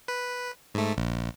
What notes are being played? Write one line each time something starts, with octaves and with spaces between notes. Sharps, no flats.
B4
G#2 A3
A#1